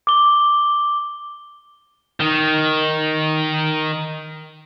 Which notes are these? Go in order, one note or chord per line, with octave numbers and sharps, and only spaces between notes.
D6 G7
D#3 D#4